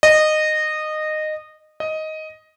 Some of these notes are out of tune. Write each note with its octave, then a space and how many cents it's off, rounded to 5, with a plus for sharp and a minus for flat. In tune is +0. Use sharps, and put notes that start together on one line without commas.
D#5 -15
D#5 +10